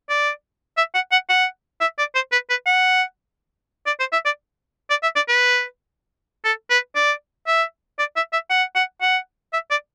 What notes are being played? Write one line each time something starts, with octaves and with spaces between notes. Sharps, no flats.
D5
E5
F#5
F#5
F#5
E5
D5
C5
B4
B4
F#5
D5
C5
E5
D5
D5
E5
D5
B4
A4
B4
D5
E5
D5
E5
E5
F#5
F#5
F#5
E5
D5